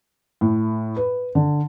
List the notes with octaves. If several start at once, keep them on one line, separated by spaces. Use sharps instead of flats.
A2
B4
D3